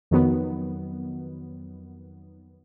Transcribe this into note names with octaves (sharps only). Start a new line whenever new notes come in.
F2 D#3 F#3 B3